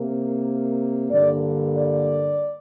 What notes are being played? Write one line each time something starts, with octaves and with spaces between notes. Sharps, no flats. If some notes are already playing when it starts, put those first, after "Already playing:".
Already playing: C3 A#3
G2 D3 A#3 D5
D5